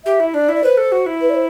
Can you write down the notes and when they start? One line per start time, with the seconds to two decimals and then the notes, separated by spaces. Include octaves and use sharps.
0.05 G4 E5
0.20 E4
0.34 D4 D5
0.49 E4
0.55 D5
0.63 B4 C5
0.77 A4
0.92 F#4
1.06 E4
1.21 B4
1.30 D5
1.35 C5